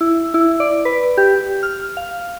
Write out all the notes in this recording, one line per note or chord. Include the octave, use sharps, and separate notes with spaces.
E4
E4
D5
B4
G4
F6
F5